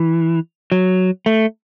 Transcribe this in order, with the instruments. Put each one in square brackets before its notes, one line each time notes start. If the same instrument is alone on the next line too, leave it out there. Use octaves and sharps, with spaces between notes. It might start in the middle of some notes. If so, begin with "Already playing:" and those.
Already playing: [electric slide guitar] E3
F#3
A3